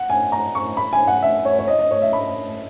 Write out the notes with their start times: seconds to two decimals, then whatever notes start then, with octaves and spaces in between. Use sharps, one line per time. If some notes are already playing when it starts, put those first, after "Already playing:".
Already playing: F#5
0.10 G#5
0.32 A#5
0.55 C#6
0.77 B5
0.93 G#5
1.07 F#5
1.22 E5
1.45 C#5
1.59 C#5
1.68 D#5
1.79 D#5
1.91 C#5
2.02 E5
2.13 B5